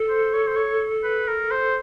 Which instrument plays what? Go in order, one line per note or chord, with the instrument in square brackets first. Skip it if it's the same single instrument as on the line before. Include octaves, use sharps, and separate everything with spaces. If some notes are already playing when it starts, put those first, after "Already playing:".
Already playing: [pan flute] A4
[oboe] C5
C#5
C5
C#5
B4
A#4
C5